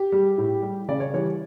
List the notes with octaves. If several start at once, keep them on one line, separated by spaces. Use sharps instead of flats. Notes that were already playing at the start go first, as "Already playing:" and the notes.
Already playing: G4
G3
A2
G3
C#3 D5
C#5
E3 G3 C#5